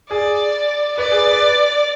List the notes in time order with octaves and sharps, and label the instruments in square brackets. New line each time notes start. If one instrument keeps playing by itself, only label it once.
[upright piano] G#4 [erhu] D5
[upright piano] B4 [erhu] D5
[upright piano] G#4
B4